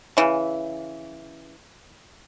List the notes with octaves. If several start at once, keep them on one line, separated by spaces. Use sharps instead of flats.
C#3 E3